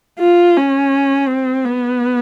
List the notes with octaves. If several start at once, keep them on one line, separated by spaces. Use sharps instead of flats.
F4
C#4
C4
B3